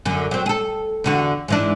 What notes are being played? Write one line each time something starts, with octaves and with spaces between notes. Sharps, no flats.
F#2 D3
F#3 C4
G#4 A4
E2 D3 F#4
G#2 E3 D4